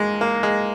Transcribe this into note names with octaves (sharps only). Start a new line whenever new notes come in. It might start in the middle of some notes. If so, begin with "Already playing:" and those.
Already playing: D#2 G#3 A#3
A#3
G#3